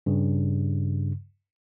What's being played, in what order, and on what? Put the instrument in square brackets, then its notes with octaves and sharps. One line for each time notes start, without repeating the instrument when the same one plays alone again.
[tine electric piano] G2 C#3